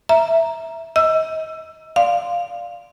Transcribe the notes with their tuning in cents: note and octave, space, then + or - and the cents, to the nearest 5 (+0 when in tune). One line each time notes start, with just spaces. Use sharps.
E5 +0 A#5 +0
D#5 +30 E6 +15
D5 +0 F5 +0 C6 +0